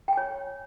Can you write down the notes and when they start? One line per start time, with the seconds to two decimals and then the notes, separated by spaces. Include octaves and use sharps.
0.08 G5
0.13 G#5
0.17 C#5